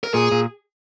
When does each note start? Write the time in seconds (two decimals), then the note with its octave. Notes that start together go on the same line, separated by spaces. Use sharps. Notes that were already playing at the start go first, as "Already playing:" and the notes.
0.04 A#4
0.14 A#2 G#4
0.32 A#2